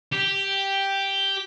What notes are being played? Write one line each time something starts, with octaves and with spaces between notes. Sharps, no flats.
G4